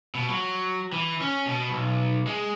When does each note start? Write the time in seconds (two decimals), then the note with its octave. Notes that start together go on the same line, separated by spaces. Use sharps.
0.15 B2
0.29 F#3
0.92 E3
1.21 C#4
1.46 B2
1.70 B1
2.27 G#3